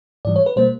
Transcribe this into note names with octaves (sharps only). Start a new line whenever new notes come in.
G#2 E3 G3 D5
C#5
B4
B2 G3 A#3 C5